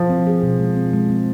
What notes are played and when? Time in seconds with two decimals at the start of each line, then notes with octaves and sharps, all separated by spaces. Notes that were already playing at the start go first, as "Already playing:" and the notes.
Already playing: F3
0.09 C4
0.27 G#4
0.43 B2
0.59 G#3
0.76 C4
0.93 G#3
1.10 C4